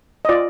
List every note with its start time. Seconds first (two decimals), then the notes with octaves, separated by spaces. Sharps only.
0.25 D#5
0.29 F4 D5